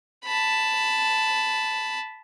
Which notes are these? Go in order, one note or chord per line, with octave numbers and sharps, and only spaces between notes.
A5 B5